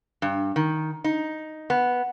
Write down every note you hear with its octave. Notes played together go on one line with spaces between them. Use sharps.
G2
D#3
D#4
B3